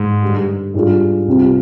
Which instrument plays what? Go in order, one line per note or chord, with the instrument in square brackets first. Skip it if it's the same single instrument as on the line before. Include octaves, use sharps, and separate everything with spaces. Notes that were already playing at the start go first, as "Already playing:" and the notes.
Already playing: [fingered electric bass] G#2
[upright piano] G2 D3 G3
G#2 G3 D4 F4 G#4
C2 C3 G3 C4 F4